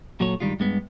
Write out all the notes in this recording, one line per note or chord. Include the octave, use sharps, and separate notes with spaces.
A#2 F#3 F#4 A4 C#5
G2 D#3 G3 G#3 F4
G2 G#3 B3